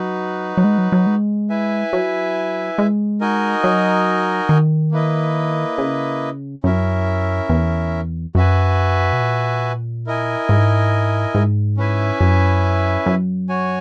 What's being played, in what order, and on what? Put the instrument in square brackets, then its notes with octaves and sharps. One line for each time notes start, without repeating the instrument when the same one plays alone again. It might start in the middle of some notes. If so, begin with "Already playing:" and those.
Already playing: [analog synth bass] F#3 [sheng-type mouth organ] D#4 F#4 B4
[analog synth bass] F#3
G#3
F#3
F#3
G#3
[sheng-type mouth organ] E4 B4 E5 G#5
[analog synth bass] F#3
G#3
[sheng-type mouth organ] D#4 F#4 A#4 D#5 G#5
[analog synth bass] F#3
D#3
[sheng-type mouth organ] A#3 E4 B4 D#5
[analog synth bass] C#3
[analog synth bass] F#2 [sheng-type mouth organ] C#4 E4 A#4 E5
[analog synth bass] E2
[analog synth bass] F#2 [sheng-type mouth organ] F#4 B4 E5 G#5
[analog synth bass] B2
A#2
[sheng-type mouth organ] E4 A#4 D#5 G#5
[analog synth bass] G#2
G#2
[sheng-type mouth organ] C#4 E4 B4 E5 G#5
[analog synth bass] F#2
F#2
[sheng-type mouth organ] F#4 C#5 G#5